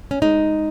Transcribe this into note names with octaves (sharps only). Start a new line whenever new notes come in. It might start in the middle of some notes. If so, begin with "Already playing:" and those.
C#4
G#3 D#4